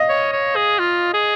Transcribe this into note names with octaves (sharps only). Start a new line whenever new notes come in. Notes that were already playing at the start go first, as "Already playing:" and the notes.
Already playing: D#5 F5
C#5
C#5
G#4
F4
G#4